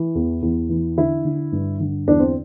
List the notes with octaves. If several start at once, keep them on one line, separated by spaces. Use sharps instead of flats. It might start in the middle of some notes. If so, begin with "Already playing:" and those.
Already playing: E3
E2
E2
E3
D3 E4
D3
G2
D3
E2 D4
C4